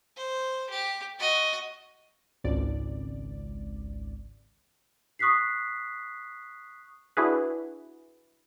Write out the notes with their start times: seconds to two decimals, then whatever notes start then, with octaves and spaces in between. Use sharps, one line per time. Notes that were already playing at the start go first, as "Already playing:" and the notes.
0.16 C5
0.70 G4
1.19 F#4 D#5
2.44 G#1 C#2 D5
5.19 C#6 D#6 F#6 B6 C7
7.17 D4 E4 F#4 G#4 B4